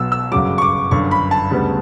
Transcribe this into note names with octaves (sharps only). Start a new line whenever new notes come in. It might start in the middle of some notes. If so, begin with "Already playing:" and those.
Already playing: B1 B2 F#3 B3 E6
E6
G1 F#2 C#3 F#3 D6
C#6
D6
G1 F#2 D3 C#6
B5
A5
D2 C#3 G3 B3